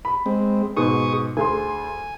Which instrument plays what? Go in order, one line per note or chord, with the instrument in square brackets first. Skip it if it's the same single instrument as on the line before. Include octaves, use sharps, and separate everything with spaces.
[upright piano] B5
[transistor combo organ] G#3 C4
[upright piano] G#2 B2 [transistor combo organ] G#4 C#6 D#6
[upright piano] D2 G#4 C6 [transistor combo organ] G#5